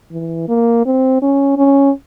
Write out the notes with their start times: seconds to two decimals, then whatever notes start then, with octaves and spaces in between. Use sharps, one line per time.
0.11 E3
0.48 A#3
0.86 C4
1.22 C#4
1.57 C#4